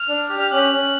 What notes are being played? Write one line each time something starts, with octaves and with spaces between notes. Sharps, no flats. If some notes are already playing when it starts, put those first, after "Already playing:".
Already playing: F6
D4
G4
F6
C#4 F#6
C#4